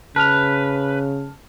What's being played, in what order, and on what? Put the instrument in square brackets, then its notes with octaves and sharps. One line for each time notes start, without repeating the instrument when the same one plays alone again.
[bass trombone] C#3 [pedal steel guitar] B4 [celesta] A5 F6 F7